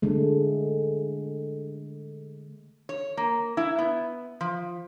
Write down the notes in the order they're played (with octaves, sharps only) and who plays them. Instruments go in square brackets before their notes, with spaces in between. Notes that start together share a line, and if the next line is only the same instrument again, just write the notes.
[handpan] D3 G#3 A3
[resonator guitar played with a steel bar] C#5
A#3
E4
B3
F3